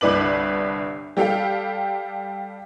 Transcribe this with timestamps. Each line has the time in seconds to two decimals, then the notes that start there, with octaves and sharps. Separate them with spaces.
0.01 G1 C2 D4 B4 D6 F#7
1.17 G3 G4 A4 F5 G5